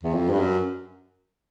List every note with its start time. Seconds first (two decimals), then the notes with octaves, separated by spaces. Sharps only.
0.03 E2
0.14 F2
0.30 G2
0.40 F#2